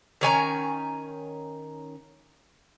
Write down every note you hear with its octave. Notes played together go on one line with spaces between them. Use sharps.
D#3 C#4 G#5 A#5